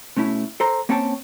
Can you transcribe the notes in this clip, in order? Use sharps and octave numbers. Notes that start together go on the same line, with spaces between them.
B2 A3 C#4 E4
A4 C5 A#5
A#3 C4 C#4 C#5 G5 A5